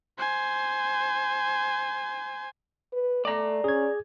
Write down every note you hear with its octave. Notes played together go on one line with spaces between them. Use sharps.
C5 G#5
B4
A3 D5 A#5
C#4 G#4 G#6